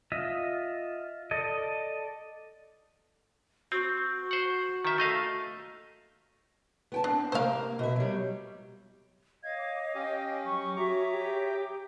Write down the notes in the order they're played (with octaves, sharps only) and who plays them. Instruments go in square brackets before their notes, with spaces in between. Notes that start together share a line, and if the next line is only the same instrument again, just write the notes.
[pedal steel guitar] F4 D#5 E5
A4 D5 D#5
[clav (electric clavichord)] C4 [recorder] F#4
[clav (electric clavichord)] C5 F#5
D#3 E5
A3 D#5 F5
[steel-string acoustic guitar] B3 G5 A5
[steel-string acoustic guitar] C4 [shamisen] D4
[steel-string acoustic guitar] C3 A#3 [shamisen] C5 F5
[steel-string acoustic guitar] B2 E5
F#3 G3
[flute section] C#5 D#5 F5 [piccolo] G#6
[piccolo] D6
[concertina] C#4 G4 [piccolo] G5
[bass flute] F#3 [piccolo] C#6
[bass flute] F#4 [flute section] G#4 C#5 E5 [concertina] A#5 D6
[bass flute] G4 [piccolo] G5